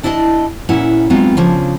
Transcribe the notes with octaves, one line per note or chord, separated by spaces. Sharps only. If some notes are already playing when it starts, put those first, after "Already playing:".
D4 E4 D5 D#5 G5 A5
A#2 C#4 E4 E5 F#5
F#3 G#3 B3 C4 D#4 F4
C#3 F3 D4 G#4